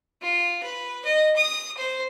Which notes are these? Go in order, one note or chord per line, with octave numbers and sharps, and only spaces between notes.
F4
B4
D#5
D#6
C5